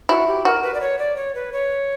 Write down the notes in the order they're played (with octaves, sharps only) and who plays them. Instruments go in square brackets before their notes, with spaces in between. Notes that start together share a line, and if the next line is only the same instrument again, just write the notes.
[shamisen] E4 [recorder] F#4
[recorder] G4
[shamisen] F#4 [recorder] A#4
[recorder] B4
D5
C#5
D5
C#5
B4
C#5